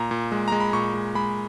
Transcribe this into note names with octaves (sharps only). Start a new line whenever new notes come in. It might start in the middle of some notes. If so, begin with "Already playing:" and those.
Already playing: A#2 A#5
A#2
G#3
G#3 A#5
B5
A#2 C#6
G#3
G#3 B5